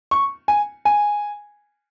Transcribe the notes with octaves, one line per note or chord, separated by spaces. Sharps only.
C#6
G#5
G#5